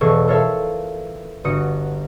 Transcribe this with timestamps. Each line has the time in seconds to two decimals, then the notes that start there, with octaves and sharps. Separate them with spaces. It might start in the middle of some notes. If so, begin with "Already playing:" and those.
0.01 E1 E3 A4 C#6 G#6 C7
0.28 F4 A4 A#4 C#5 E5 F5
1.44 G1 F#4 D#6 C#7